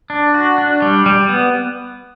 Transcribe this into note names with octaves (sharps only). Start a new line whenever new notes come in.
D4
F#4
D4
G3
G3
B3